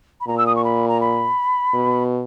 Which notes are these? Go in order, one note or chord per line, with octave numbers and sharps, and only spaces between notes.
B5
A#2 A#5
E6
D#6
C#6
B5
A#5
B5
B2